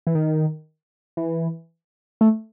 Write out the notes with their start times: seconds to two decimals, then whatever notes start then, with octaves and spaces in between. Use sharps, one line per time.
0.07 E3
0.15 D#3
1.17 E3
2.21 A3